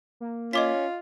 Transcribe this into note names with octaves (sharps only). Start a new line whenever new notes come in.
A#3
C#4 F4 D#5 D6 B6